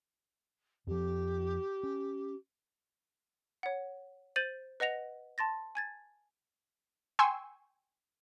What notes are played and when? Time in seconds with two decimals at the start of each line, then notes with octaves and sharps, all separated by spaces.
0.87 F2 F3 G4
1.83 C#4
3.63 C#5 F#5
4.36 C5 G6 A6 D#7 F#7
4.80 B4 D#5 F#5 A#6 F7
5.38 A5 C6 A6 A#6
5.75 G#5 G#6 A6
7.19 G5 G#5 C6 C#6 E6